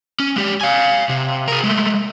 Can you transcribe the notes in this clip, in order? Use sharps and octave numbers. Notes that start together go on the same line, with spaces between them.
C#4
G#3 G4
F5 G#5
C3
G#4 A#4
G#3 A3